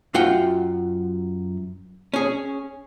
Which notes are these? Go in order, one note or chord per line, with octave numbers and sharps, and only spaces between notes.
F#2 F4 F#5 G5
C#4 G#4